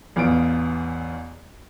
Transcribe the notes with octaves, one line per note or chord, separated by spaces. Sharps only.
A1 E2 B3 F4 D7